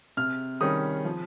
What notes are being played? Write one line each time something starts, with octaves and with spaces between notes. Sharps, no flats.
C3 F6
D#3 G3 C#4 D#6
F3